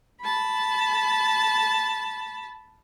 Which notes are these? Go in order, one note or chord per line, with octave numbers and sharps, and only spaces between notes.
A5 B5